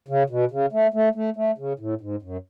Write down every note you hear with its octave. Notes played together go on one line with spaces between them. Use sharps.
C#3
B2
C#3
A3
A3
A3
A3
C#3
A2
G#2
F#2